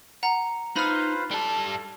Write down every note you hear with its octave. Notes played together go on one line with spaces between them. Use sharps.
F#5 A#5
D#4 F4 B4 C5 B5 F6
G3 A4 A5